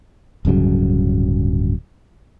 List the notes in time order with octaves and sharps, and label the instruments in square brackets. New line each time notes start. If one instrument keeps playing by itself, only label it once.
[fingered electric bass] D1 G2 C#3 F#3